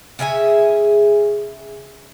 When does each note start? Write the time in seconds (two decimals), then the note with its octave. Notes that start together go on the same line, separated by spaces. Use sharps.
0.19 C#3 G#4 E5 G#5